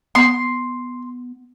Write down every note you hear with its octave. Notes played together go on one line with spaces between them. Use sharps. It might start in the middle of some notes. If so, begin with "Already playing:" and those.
B3 C6